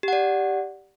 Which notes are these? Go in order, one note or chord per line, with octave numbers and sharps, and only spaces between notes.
G4 D5 F#5